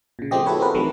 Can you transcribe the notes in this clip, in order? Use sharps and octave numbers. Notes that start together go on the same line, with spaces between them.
A#2 C#3
F3 G#3 A3 C4 G4 D#5
E4 F#4 A4 B4 C#5
C4 F#4 G#4 A#4 B4
C3 D#3 E3 F#3 A3